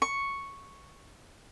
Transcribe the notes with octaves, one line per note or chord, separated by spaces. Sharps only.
C#6